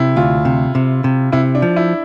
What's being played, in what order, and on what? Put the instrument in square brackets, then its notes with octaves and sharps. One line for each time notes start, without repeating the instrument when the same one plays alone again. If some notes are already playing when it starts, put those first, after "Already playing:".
Already playing: [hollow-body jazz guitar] C3 [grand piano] E4
[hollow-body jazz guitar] D2 [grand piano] F4
[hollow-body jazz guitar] C3
C3
C3
[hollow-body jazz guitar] C3 [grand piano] E4
[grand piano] D4
[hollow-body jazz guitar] F3
[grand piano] E4